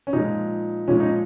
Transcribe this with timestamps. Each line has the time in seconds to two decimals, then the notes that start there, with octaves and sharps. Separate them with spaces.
0.07 C#4
0.13 A#2 F3 G#3 D#4
0.88 A#2 F3 G#3 C#4
1.00 D#4